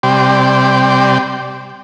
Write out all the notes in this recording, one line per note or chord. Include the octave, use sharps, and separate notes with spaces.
C3 G3 C5 D5 G5